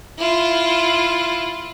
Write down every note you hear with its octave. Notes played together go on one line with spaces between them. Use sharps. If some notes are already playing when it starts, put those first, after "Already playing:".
E4 F4